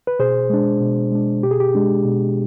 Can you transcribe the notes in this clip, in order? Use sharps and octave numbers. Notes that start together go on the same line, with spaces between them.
B4
B2 G#4 C5
G#3 D4
B2
G#3 D4
B2 G4
G#4
G4
G#3 D4
B2